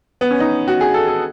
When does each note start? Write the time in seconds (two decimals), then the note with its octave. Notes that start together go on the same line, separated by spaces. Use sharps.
0.21 B3
0.31 C#4
0.40 D#4
0.68 F#4
0.81 G#4
0.94 A4
1.08 A4